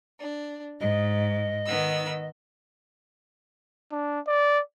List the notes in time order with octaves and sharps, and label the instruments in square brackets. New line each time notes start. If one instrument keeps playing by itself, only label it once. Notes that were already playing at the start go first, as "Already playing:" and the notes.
[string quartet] D4
[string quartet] G#2 [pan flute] D#5
[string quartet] D#3 B3 E6
[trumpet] D4
D5